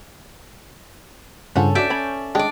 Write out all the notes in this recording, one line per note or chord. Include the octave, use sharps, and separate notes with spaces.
G2 C#3 C#4 F4 A4 C5 F#5
D4 F#4 D5 E5 G6
C#4 B4 C#5 B5
G#3 D4 D5 D#5 G5